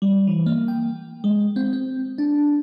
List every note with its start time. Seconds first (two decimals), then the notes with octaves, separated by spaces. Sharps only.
0.02 G3
0.27 E3
0.46 A#3
0.68 G5
1.24 G#3
1.56 C4
1.73 C4
2.18 D4